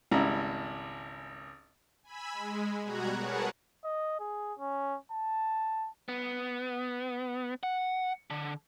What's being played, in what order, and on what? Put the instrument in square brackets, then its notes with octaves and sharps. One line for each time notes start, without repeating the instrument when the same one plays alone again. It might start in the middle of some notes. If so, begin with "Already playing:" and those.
[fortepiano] G#1 C#2 G3 E4 A#5
[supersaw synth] G#5 B5 E6
G#3
B2 G3 F#4 A#5 F#6 G#6
G#4 A#4 B4 C#5 F#5 A5
[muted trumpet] D#5
G#4
C#4
A5
[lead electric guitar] B3
F#5
D3